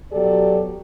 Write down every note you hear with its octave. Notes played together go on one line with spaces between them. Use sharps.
B2 F#3 G4 A4 D5